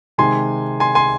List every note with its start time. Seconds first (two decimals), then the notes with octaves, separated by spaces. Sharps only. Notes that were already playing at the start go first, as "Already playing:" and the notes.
0.18 C3 D#3 G#3 G#5 C6
0.80 G#5 C6
0.95 G#5 C6